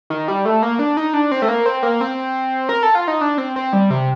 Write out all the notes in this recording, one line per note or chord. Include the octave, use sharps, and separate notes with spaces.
D#3
G3
A3
A#3
D4
D#4
D4
C4
A3
A#3
C4
A#3
C4
A#4
A4
F4
D#4
D4
C4
C4
G3
C3